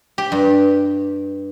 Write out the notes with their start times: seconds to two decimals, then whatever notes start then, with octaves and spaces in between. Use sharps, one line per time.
0.18 G4
0.32 G2